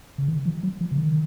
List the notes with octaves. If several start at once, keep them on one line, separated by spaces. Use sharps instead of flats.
C#3
D#3
F3
F#3
F3
C#3
D#3